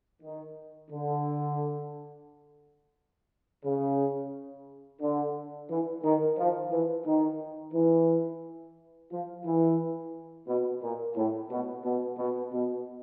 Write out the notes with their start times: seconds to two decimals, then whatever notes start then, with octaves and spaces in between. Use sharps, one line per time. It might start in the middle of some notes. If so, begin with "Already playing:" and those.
0.22 D#3
0.91 D3
3.64 C#3
5.01 D3
5.69 E3
6.04 D#3
6.38 F3
6.71 E3
7.06 D#3
7.73 E3
9.11 F3
9.45 E3
10.48 B2
10.82 A#2
11.16 A2
11.50 B2
11.84 B2
12.18 B2
12.53 B2